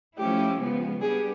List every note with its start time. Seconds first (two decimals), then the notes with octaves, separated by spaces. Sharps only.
0.18 F3 A3 C#4 E4 G4
0.59 C#3 F3 G#3 B3
1.00 G3 B3 D4 G4 G#4